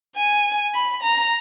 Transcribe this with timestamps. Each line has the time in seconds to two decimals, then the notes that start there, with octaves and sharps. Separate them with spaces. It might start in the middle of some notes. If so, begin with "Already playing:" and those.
0.16 G#5
0.74 B5
1.03 A#5